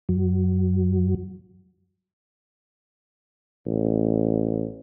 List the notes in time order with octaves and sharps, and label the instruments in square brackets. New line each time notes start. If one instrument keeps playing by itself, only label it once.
[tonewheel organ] F#2 F#3
[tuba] A1